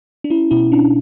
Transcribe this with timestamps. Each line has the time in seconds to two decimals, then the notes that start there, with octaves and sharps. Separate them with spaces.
0.24 D4
0.30 C#4 E4
0.51 B2 E4
0.72 C#4 D4